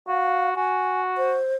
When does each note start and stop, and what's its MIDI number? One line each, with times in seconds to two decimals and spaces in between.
0.08 0.51 66
0.08 0.50 77
0.56 1.36 66
0.56 1.01 80
1.17 1.56 72